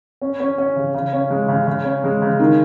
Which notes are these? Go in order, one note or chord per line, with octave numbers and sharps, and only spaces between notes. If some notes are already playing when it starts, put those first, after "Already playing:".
C#4
C#4
C#4
C#3
C#3
C#4
G#3
C#3
C#3
C#4
G#3
C#3
D#3